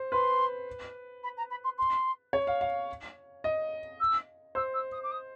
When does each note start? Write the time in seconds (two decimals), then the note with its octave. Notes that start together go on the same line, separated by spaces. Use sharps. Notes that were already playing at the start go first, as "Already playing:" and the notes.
Already playing: C5
0.12 B4 C6
1.23 B5
1.37 A#5
1.50 B5
1.64 C6
1.78 C6
2.33 C#5
2.47 F5
2.61 F5
3.44 D#5
4.00 E6
4.55 C5 E6
4.73 E6
4.92 D#6
5.03 D6
5.11 D#6